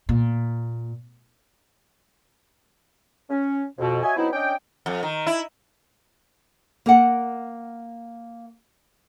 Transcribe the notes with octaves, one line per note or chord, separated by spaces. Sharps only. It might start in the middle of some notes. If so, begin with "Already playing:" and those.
A#2
C#4
F2 B2
F#4 C#5 D#5 E5 G#5
F#3 B3 C4 D#4 E4
C#4 D4 D5 D#5 G5
F2
D#3
E4
A#3 A#4 F#5